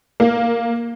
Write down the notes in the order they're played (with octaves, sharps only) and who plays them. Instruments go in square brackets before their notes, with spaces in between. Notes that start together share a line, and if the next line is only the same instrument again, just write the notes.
[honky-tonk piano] A#3